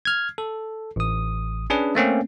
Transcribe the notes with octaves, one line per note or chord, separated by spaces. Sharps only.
F6 G#6
A4
A1 D#6
C#4 D4 G#4 B4
A3 A#3 C4 C#4